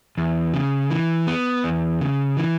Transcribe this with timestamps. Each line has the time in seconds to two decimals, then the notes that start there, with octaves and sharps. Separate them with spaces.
0.18 E2
0.54 C#3
0.91 E3
1.27 B3
1.64 E2
2.01 C#3
2.37 E3